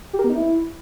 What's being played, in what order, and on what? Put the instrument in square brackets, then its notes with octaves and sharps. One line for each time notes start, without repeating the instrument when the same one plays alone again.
[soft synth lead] G4
A#4
B3
D#4
E4